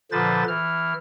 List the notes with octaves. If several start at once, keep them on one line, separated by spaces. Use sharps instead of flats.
A#2 D3 F3 B4 C5 A6
E3 F6